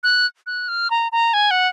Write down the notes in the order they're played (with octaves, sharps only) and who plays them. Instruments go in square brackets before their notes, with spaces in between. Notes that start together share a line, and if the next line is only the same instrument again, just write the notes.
[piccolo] F#6
F#6
F6
A#5
A#5
G#5
F#5